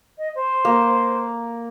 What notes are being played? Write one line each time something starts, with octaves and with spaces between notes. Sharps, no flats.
D#5
C5
A#3